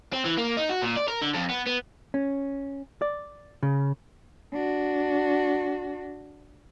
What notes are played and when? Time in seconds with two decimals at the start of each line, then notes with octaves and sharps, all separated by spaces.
0.13 C4
0.25 E3
0.38 A#3
0.57 D#4
0.69 F#4
0.82 A#2
0.96 D5
1.08 A#4
1.22 D3
1.34 F2
1.50 B3
1.66 B3
2.14 C#4
3.02 D5
3.63 C#3
4.53 D4 F#4